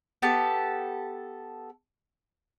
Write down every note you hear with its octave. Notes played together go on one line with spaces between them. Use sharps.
B3 G4 A4 A5